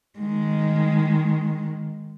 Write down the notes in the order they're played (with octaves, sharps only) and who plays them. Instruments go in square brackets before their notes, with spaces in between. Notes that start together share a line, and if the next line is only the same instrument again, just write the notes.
[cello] D#3 G#3